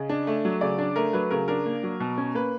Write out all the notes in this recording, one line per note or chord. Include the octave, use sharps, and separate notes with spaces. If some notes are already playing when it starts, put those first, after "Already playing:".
Already playing: C#3 D#5
D4
A3
F#3
C#3 D5
D4
A3 A#4
F#3 B4
C#3 A#4
D4 A#4
A#3
F#3
B2
C#4
A#3 B4